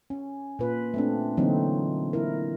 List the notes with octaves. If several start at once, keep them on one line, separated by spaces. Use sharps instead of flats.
C#4
A#2 F4 B4
A3 C4 D4
D3 E3 F#3 A#3 C4 D#4
E4 A#4